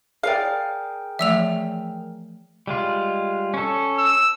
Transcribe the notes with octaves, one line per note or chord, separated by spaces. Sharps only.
G#4 A#4 D5 F5 G5
E3 F3 A3 E5 E6 F7
G3 G#3 F4
C#4 A4
E6